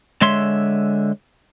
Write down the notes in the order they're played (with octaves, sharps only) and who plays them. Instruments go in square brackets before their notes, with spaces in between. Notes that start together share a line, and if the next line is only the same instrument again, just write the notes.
[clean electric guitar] D3 G#3 C#5 E5 C6